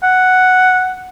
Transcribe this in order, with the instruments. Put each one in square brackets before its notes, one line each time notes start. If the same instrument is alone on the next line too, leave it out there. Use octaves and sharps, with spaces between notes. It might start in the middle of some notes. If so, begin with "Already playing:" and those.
[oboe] F#5